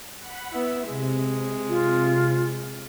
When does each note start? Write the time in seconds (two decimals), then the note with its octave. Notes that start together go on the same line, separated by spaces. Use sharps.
0.17 F#5 B5
0.52 B3 E4 E5
0.88 C3 G#3
1.68 F4